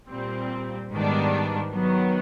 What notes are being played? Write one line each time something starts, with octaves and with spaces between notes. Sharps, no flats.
A#2 G3 C4
G#2 D#3 G3 B3 D4
D#3 F#3 B3